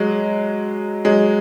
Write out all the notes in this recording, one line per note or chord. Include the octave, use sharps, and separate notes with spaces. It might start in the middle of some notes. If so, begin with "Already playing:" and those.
Already playing: F#3 G#3
F#3 G#3